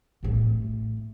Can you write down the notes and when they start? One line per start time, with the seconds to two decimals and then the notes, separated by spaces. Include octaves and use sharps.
0.23 A2 A3